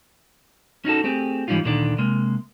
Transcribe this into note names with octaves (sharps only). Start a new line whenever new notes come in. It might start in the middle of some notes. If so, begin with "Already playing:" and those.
C#4 D#4 F#4 A4
A3 C4 G4 G#4
G#2 E3 G3 C#4 D#4 F4
D2 A#2 D3 D#3 D4 D5
C3 G#3 A#3